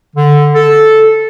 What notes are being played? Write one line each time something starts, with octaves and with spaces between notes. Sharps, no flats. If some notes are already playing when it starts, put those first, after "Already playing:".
D3
A4